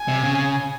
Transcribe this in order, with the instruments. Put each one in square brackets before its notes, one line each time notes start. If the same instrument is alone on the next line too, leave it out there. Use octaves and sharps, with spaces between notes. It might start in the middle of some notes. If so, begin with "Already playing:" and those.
Already playing: [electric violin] G#5
[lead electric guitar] C3
C#3